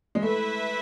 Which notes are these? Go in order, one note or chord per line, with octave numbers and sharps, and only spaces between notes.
G#3
A3 E4 B4 E5